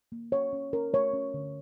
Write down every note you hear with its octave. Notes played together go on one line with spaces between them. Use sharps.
A#3
C#4 C#5
C#4
C#4 A#4
A3 C#5
C#4
D3